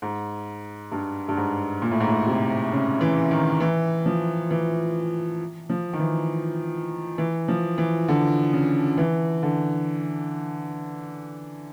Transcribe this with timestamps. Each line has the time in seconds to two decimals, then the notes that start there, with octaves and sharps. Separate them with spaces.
0.02 G#2
0.92 G2
1.29 G2
1.37 G#2
1.82 A#2
1.91 A2
2.00 G#2
2.08 A2
2.26 C3
2.72 C#3
3.01 E3
3.31 D#3
3.60 E3
4.06 F3
4.51 E3
5.69 F3
5.93 D#3
5.99 E3
7.18 E3
7.48 F3
7.78 E3
8.08 D3
8.53 C#3
8.98 E3
9.43 D3